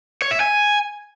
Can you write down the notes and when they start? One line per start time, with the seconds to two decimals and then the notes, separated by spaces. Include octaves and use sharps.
0.22 C#5
0.31 E5
0.40 G#5